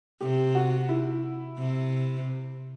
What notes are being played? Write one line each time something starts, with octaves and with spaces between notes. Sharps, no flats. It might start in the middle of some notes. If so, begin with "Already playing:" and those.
C3 G4
F#4
E4
C3